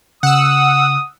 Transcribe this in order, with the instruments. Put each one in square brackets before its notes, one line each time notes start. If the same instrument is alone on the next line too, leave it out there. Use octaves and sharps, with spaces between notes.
[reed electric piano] C#3 [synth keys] F#5 E6 [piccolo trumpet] D#6